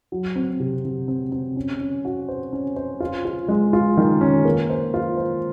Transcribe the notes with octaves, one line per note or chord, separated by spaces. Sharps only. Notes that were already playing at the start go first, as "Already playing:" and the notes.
F#3
C4
C3
C3
C4
C4
C#4
C#4
F#4
C5
C#4
C5
F4
F4
G#3
F4
D#3
C#4
A#3
C5
F4
C5